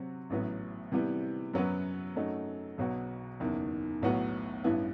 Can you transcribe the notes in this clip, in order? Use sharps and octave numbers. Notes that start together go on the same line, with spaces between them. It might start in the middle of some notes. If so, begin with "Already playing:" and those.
Already playing: C3 F#3 C4 F#4
A1 A2 F#3 B3
C3 E3 G3 B3
F#2 F#3 B3 F#4 B4
F#2 F#3 A3 D#4
B1 B2 F#3 B3 F#4
F#1 E2 D#3
B1 A2 F#3 B3 F#4
A1 G2 E3 B3 E4